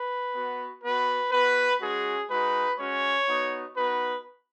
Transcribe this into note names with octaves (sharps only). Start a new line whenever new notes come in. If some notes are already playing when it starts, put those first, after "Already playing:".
Already playing: B4
B3 F#4
B3 F#4 B4
B3 F#4 B4
G#3 C#4 F#4 G#4
G#3 D#4 F#4 B4
G#3 C#4 F#4 C#5
B3 D#4 F#4
B3 D#4 F#4 B4